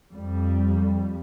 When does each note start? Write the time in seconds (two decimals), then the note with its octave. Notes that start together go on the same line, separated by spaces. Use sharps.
0.13 F2 G3